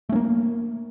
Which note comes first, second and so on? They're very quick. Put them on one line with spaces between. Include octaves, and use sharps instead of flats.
A3 C#4 A#3